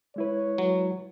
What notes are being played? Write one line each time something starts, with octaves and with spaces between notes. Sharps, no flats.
G#3 E4 B4 C#5
F#3